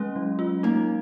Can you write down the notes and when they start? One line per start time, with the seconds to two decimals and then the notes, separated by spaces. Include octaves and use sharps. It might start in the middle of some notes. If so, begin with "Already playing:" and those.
Already playing: G#3 C#4
0.16 F#3
0.39 F4
0.63 A#3 D#4